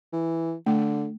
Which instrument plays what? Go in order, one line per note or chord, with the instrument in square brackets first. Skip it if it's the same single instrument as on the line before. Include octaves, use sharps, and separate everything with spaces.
[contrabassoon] E3
[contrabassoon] D3 [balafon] A3